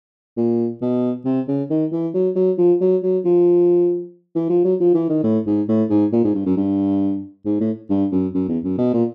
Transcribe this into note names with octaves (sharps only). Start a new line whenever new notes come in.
A#2
B2
C3
C#3
D#3
E3
F#3
F#3
F3
F#3
F#3
F3
E3
F3
F#3
F3
E3
D#3
A2
G#2
A2
G#2
A#2
G#2
G2
F#2
G2
G#2
A2
G2
F#2
F#2
E2
F#2
B2
A#2